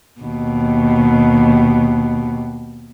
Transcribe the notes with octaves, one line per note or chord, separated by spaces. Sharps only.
D#2 B2